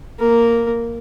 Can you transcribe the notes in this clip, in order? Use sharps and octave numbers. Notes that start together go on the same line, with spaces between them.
A#3 A#4